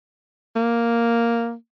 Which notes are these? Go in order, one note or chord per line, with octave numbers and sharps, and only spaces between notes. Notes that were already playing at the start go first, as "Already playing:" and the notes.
A#3